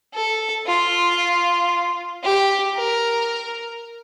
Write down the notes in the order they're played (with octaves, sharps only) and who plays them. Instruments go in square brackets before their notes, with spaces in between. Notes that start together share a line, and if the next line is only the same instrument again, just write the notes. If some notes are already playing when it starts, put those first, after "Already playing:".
[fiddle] A4
F4
G4
A#4